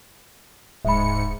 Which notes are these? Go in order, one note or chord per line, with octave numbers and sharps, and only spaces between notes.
D1 G#2 E5 B5 C#7